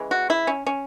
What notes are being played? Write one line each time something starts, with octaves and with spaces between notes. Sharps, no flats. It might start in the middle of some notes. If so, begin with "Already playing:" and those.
Already playing: C#3 E3 G#3
F#4
E4
C#4
C#4